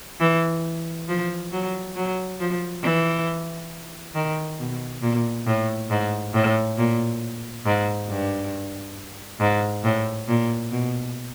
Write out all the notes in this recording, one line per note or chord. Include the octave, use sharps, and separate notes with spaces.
E3
F3
F#3
F#3
F3
E3
D#3
B2
A#2
A2
G#2
A2
A#2
G#2
G2
G#2
A2
A#2
B2